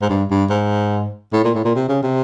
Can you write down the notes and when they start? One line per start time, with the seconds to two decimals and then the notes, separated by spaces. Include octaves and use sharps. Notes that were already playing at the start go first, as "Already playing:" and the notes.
0.01 G#2
0.09 G2
0.30 G2
0.50 G#2
1.33 A2
1.44 A#2
1.55 A2
1.65 A#2
1.75 C3
1.89 C#3
2.03 C3